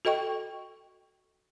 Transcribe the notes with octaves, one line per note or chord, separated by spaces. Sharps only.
F#4 A4 D#5 G5 C#6